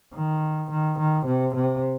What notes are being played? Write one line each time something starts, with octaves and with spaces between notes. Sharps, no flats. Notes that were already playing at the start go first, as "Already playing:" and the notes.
D#3
D#3
D#3
C3
C3